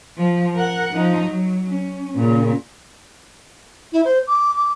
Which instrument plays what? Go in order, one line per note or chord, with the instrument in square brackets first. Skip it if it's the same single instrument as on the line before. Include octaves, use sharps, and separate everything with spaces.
[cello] F3
A#4 F#5
F3 D#4
F#3
C#4
A#2 C#3
[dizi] E4
C5
D6
D6